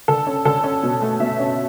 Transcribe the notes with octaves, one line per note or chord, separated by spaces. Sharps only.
D3 A4
C#4
D3 A4
C#4
B2
A3
B2 E5
C#4